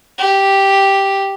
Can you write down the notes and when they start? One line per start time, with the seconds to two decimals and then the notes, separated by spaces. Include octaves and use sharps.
0.18 G4